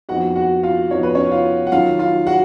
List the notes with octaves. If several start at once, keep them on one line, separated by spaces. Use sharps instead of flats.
F2 F3 B3 D#4 F#4 F#5
F#4 F#5
F4 F5
F2 F3 B3 D#4 C#5
B4
C#4 C#5
F4 F5
F#5
D#3 F#3 C#4 F4 F5
F4 F5
F#4 F#5